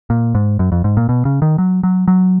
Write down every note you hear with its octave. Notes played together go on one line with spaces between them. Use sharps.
A#2
G#2
F#2
F2
G#2
A#2
B2
C#3
D#3
F#3
F#3
F#3